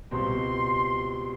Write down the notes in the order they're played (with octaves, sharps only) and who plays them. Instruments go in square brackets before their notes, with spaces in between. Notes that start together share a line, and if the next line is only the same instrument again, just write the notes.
[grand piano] C#2 B2 G3 C4 [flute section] C6